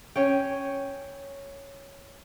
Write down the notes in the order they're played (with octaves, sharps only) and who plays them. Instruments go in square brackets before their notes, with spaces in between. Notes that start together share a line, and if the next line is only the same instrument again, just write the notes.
[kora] C#4 C#5 G5